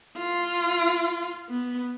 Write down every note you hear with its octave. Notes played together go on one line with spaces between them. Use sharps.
F4
B3